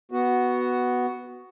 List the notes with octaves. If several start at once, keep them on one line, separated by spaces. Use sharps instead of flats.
B3 F#4